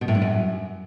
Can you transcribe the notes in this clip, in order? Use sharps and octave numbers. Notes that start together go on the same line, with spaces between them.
B2
A2
G2
F#2